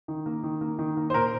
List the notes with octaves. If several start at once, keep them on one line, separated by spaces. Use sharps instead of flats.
D#3
A#3
D#3
A#3
D#3
A#3
C5
A#2 A#4